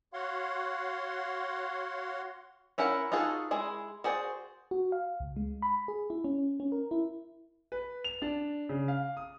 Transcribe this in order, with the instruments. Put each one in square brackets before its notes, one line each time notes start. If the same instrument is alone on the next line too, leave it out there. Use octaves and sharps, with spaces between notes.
[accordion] F#4 C#5 F5 F#5 C6
[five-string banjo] C#4 E4 A#4 F#5
D#4 F4 F#4 G#4 A4
G#3 E4 G#4
F#4 G#4 C5 D5
[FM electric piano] F#4
F5
C#2
G#3
B5
G#4
E4
C#4
C#4
A#4
E4
[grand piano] B4
F7
D4
C#3
F5
D#6